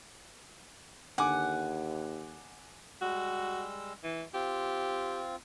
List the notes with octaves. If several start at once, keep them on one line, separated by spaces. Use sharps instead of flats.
D#2 D3 F#5 G#5 D6
G3 G#3 F#4 E6
E3
C4 F4 G4